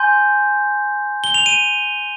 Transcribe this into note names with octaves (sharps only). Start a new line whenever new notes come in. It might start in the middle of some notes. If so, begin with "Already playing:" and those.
Already playing: G#5 C6 G6
G7
F7
D#7